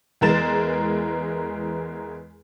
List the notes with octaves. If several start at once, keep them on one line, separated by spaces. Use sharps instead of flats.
E2 E3 G#3 A#4 A6 E7